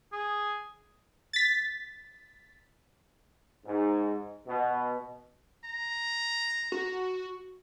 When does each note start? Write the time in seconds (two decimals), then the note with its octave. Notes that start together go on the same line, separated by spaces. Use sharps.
0.12 G#4
1.33 A6 B6
3.65 G#2
4.47 B2
5.65 A#5
6.72 F#4